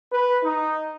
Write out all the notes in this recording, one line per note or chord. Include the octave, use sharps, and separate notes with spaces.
B4
D#4